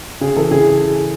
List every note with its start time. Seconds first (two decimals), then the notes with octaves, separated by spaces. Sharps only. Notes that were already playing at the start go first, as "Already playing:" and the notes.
0.21 C#3 G#4
0.37 E3 A4
0.51 C#3 G#4